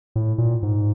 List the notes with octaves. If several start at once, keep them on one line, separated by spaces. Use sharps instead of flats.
A2
A#2
G#2